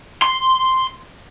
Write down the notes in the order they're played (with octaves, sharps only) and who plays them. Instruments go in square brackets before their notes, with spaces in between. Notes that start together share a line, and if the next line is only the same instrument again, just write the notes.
[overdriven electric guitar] C6